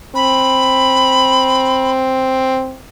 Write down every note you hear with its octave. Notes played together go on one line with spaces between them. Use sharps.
C4 B5